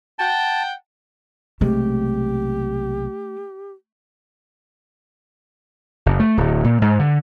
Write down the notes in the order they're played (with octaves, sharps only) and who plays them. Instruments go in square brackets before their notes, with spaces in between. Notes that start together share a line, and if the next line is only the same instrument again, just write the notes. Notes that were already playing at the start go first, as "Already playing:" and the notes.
[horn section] F#5 G5 [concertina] A5
[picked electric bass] B1 C3 G#3 [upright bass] A3 [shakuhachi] G4
[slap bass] F#1
A3
D1
A#2
G#2
D3